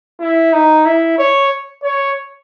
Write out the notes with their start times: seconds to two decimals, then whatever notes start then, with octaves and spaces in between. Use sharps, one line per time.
0.20 E4
0.53 D#4
0.85 E4
1.18 C#5
1.83 C#5